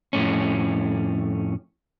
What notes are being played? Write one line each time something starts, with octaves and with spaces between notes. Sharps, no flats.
F2 A2 C#4